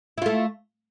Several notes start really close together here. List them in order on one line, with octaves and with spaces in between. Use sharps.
E4 F4 A3